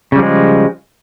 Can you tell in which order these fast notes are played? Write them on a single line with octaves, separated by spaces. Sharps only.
C#3 G3 F3 G#3